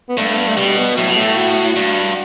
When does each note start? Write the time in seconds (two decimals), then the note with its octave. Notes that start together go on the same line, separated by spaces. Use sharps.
0.09 B3
0.17 G2 A3
0.28 A3
0.38 B3
0.48 A3
0.57 B2 G3
0.78 B3
0.97 A2 F#3
1.08 B2
1.17 A2 A3
1.37 F#4
1.76 G2